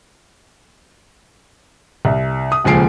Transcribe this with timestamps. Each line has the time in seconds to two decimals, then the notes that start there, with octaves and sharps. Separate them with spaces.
2.05 C2
2.52 D#6
2.64 D#1 C#2 F3 G#5 C7 D7